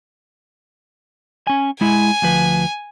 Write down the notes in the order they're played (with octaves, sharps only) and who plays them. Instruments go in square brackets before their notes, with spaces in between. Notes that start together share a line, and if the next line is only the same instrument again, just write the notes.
[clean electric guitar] C#4 G#5
[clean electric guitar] G#3 E4 [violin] G#5
[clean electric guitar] D2 F3 B4